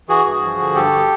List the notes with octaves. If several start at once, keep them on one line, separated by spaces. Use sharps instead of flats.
E3 F#4 G#4
G2
F3
D3
G2 G4 A4